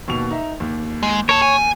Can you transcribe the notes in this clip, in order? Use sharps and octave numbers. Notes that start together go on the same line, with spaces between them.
D#2 B2 F7
D#4 E5
D#2
G#3
A#4 C#5 A5
G#5